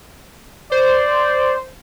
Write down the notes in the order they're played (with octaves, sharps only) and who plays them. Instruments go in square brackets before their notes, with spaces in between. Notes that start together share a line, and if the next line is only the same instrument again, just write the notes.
[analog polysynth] C5 [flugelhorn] D5